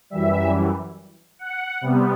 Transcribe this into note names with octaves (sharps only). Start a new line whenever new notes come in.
F#2 E3 G3 E5
F#5
C3 G3 B3